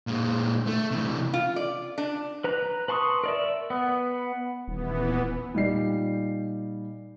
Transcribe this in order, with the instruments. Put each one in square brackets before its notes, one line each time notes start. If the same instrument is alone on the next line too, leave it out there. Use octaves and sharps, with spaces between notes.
[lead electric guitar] A#2 G#3
A3
C3 E3
[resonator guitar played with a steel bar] F4
D5
D4
[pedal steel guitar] B4 A#5 F#6
B4 A5 C6 C#6 D#6
A#4 D5 E5
B3
[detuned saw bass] D#1 [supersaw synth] E3 B3
[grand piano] A#2 G3 D#4 D5 C7